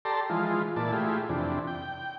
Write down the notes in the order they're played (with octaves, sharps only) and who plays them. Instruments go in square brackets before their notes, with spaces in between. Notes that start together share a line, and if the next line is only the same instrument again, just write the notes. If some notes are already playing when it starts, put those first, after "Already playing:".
[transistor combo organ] G4 A4 D5 A5 A#5 C6
E3 F3 G#3 F4
A#2 E3 D5 A5
A3 E4 F4 G4 G#4
F2 C3 E3 D4
G5